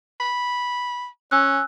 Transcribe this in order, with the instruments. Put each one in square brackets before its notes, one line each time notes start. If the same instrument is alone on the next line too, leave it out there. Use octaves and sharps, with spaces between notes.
[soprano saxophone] B5
[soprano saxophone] C#4 [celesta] G#5 E6 F#6